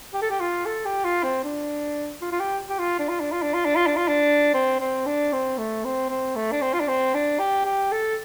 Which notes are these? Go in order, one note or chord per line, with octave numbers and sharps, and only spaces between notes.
G4
A4
G4
F4
A4
G4
F4
C4
D4
F4
F4
G4
G4
F4
D4
F4
D4
F4
D4
F4
D4
F4
D4
F4
D4
C4
C4
D4
C4
A3
C4
C4
A3
D4
C4
F4
D4
C4
D4
G4
G4
A4